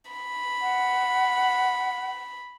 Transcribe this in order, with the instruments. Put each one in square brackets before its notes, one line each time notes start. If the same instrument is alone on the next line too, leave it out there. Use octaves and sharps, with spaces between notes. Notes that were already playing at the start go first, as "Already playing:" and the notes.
[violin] B5
[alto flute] F#5